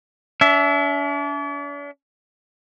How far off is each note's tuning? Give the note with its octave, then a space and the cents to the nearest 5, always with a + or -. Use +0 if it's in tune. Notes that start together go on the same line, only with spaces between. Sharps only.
D4 -45 E5 +0